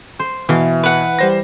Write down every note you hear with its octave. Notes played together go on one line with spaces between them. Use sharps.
C5
B2 E3 F5
B4 F#5
G3 C5 A#6